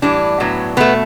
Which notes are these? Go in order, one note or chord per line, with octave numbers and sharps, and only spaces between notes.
A2 E3 G3 D4
A2 F#3 B3
B2 A3 B3